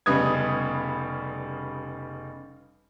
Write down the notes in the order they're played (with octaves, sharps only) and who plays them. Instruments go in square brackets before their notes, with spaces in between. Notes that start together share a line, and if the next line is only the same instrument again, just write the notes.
[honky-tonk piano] F1 C#3 G3 B3 D#6 G#6